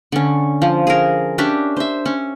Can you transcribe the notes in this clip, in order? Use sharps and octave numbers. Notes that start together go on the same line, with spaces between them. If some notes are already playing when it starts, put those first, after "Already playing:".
D3 C#4
F3
G#4 A#4
C#4 D4 G4 E5
C5 E5
C#4